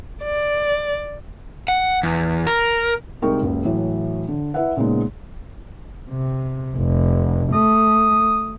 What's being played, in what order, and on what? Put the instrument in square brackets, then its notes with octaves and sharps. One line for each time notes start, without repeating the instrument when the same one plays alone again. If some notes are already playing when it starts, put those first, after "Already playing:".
[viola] D5
[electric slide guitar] F#5
E2
A#4
[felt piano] C2 G#3 D#4 A#4 G5 C#6
F#1 C#2
A2 E3 F#3
D3
E4 B4 E5 F#5
A#2 C#3 G#3 A#3 B3 D#4
[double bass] C3
F1
[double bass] A3 [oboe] D#6